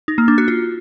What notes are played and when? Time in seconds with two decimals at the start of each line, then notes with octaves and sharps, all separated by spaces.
0.08 D#4
0.18 A#3
0.28 D4
0.38 F#4
0.48 F4